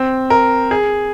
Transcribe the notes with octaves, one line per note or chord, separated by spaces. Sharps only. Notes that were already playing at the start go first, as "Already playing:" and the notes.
Already playing: C4
A#4
G#4